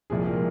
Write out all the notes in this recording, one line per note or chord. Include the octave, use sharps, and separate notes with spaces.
C2 A#2 F3 G#3 G#4
A#4